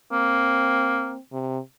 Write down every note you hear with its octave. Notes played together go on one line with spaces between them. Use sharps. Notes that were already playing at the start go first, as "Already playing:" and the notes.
A#3 C4
C3